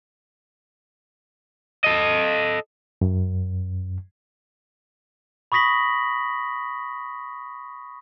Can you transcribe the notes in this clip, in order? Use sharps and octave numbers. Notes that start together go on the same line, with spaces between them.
A4 D#5
F#2
B5 C#6 D#6 A#6 B6 F#7